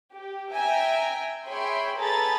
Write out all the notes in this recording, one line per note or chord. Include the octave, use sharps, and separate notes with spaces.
G4
E5 G5 G#5 A#5
G#4 C#5 E5 G5 B5 C6
G#4 A4 B4 A#5 B5 A6